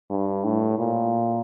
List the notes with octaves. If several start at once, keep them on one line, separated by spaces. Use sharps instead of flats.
G2
A2
A#2